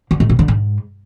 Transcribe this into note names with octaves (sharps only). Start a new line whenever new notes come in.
D3
A2
B2
D3
G#2